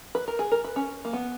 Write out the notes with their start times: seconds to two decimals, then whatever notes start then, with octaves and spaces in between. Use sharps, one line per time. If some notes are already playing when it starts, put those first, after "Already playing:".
0.15 B4
0.28 A#4
0.39 G#4
0.52 A#4
0.64 B4
0.76 C#4
1.05 A#3
1.13 B3